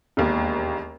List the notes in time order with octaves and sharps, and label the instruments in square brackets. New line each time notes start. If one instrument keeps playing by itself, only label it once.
[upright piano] E1 D#2